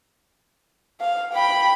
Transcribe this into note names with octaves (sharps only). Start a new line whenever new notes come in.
F5
G5 B5